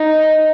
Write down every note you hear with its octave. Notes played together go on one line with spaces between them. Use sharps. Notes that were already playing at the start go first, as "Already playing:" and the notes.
Already playing: D#4